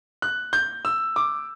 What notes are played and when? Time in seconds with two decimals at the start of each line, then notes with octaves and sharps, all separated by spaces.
0.22 F#6
0.53 G6
0.85 E6
1.16 D6